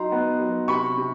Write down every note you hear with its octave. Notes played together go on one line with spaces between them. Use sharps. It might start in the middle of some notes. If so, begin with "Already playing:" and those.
Already playing: F#3 D#4 A#5 C6
B3
F#3
C3 B5 C#6
C3